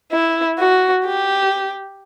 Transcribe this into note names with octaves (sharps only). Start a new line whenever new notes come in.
E4
F#4
G4